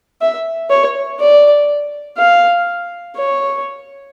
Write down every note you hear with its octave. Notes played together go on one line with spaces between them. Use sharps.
E5
C#5
D5
F5
C#5